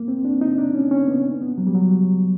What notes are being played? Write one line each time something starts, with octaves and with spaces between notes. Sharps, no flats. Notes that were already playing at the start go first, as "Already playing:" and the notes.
Already playing: A#3
C4
D4
D#4
D4
C#4
C#4
B3
B3
F#3
G3
F#3